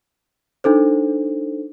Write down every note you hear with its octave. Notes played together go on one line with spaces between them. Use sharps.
D4 D#4 A4 C5